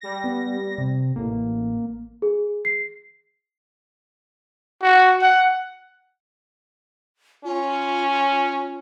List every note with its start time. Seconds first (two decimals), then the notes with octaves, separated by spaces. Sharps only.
0.01 G3 A#6
0.24 B3
0.78 C3
1.16 A1 A#3
2.22 G#4
2.65 C7
4.83 F#4
5.22 F#5
7.45 C#4 F4